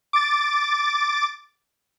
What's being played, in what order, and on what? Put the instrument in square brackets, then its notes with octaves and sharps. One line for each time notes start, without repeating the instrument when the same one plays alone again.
[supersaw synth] D6 A6